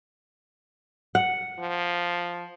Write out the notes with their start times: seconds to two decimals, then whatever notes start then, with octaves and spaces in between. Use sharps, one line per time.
1.15 F#5
1.59 F3